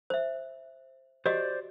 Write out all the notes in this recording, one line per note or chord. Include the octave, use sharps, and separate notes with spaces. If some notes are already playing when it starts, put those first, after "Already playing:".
C5 E5
F#4 G4 C5 D5 D#5